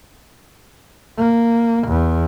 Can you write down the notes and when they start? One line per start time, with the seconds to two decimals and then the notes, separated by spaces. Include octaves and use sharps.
1.18 A#3
1.88 E2